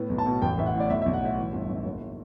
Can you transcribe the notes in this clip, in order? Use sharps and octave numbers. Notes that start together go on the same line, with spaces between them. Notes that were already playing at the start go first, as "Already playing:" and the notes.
Already playing: A2 B3
B1
A5
B2
A1 G5
A1 E5
F#5
A2
D5
B1 E5
E5
B1
F#5
A2 E5
E3
G1
F#2
F#1